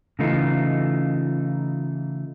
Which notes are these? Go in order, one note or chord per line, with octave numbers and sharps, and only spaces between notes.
C#3 E3 A3 D#4 F4